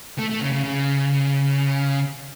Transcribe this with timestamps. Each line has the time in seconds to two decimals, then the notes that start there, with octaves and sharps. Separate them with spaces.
0.18 A3
0.30 A3
0.41 C#3
0.52 C#3
0.63 C#3